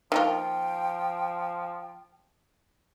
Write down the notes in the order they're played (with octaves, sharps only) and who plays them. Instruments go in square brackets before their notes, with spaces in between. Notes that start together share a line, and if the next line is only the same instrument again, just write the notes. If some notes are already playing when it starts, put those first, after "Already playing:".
[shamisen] D#3 A#3 F4 [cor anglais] F3 [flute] G5